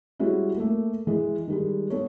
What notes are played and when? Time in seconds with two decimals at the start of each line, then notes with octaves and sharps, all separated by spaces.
0.20 G3 G#3 C#4 E4 F#4
0.56 A3 A#3
1.07 E3 G#3
1.48 D#3 G3 G#3
1.90 B3 A4 C#5